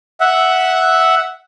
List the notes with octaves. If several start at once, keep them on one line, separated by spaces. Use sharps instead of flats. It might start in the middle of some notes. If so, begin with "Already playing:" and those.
E5 F#5